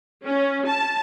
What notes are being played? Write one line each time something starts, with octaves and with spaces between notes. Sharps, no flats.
C#4
A5